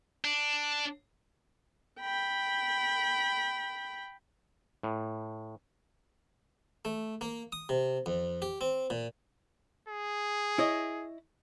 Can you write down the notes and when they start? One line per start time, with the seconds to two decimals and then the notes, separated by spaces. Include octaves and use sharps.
0.24 D4
2.00 G5 B5
4.83 A2
6.85 A3
7.21 A#3
7.52 D#6
7.69 C3
8.06 F2
8.42 G4
8.61 C4
8.90 A#2
9.88 G#4
10.58 E4 C#5 D#5